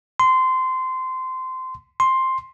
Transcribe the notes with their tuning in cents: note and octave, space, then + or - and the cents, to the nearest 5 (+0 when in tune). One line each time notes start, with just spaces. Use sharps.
C6 -20
C6 +5